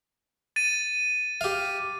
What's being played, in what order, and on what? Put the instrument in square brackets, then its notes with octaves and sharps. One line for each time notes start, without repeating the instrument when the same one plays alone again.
[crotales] A6 D#7
[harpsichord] G4 F5